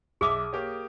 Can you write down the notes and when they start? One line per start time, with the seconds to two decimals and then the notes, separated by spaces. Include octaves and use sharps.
0.21 B1 G#4 E5 D6 D#6
0.53 A#3 G4 C#5